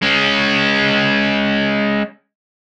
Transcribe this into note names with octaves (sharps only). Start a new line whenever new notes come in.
G#3 C#4